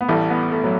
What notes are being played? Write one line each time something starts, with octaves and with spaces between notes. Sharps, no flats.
B3
A1 A2 E3 G3 A3
B3
A3
F#3